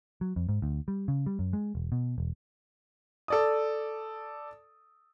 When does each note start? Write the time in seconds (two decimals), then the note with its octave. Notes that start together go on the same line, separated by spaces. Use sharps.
0.21 F#3
0.36 F2
0.49 G#2
0.62 D2
0.88 G3
1.08 C#3
1.26 G3
1.39 F#2
1.53 G#3
1.75 E1
1.92 B2
2.18 E1
3.28 A4 D5 D#6